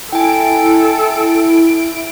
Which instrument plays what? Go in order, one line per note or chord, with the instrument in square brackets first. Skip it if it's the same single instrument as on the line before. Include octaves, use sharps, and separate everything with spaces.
[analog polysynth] E4 D7 [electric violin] A4 [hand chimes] G5 G#5